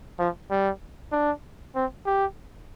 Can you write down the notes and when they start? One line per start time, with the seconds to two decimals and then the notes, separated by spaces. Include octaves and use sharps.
0.19 F3
0.51 G3
1.12 D4
1.75 C4
2.06 G4